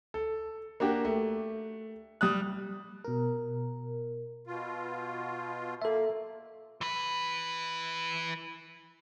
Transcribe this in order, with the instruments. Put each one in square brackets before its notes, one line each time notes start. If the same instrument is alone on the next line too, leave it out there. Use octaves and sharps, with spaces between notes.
[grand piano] A4
A#3 D4 F#4 G4
A3
G3 D#6 F#6
[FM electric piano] B2 A#4
[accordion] B2 F4
[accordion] A#3 [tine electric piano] A4 E5
[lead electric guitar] E3 B4